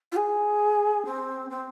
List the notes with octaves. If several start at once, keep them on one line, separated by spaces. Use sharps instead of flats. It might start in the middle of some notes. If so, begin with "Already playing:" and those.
F4
G#4
C4
C4